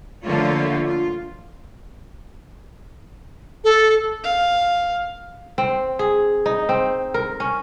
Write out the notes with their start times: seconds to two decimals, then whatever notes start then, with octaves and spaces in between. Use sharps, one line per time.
0.24 D3 F3 A3 A#3 F4 C#5
0.86 F4
3.64 A4
4.24 F5
5.58 C4
5.99 G#4
6.46 D#4
6.69 C4
7.14 A#4
7.40 C#4